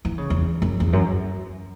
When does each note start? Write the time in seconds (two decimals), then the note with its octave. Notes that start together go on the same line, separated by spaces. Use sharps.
0.05 E3
0.18 C#3
0.30 E2
0.62 F#2
0.80 E2
0.93 F#2